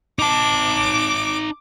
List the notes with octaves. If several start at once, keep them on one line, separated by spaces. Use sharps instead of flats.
D#4 A5 D6